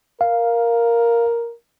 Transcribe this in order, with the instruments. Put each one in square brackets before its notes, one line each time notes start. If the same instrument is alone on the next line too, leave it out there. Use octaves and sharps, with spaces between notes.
[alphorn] A#4 [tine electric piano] F5